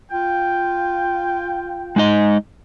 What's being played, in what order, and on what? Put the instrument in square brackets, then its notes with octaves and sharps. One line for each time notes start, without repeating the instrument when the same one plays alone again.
[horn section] F4 G5
[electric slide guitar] G#3 D#4 D#5